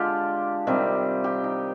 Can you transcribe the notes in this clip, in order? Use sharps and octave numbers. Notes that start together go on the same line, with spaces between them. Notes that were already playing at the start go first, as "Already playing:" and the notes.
Already playing: D3 G#3 D4 F4 G4
C3 D#3 G3
G4
D#4